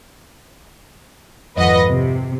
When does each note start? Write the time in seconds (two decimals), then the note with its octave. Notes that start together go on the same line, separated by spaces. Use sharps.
1.56 G#1 F2 B4 D#5 F#5
1.90 C3